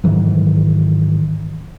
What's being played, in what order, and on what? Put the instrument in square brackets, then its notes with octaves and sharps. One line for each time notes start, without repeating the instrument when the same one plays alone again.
[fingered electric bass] G#2 D#3 E3 F#3